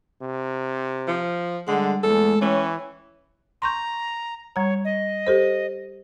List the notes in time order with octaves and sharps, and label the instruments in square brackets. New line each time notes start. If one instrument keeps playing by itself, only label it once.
[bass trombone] C3
[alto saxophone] F3
[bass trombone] D3 [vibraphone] G3 F#5 [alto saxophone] G#3
[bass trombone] E2 [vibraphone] G#3 A3 [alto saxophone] A4
[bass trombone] E3 [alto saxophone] C#4 [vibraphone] C#5 G5 C#6
[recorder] A#5 [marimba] C6 C#6 G6
[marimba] G3 A#5 [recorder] C#5
[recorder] D#5
[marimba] G4 A4 C5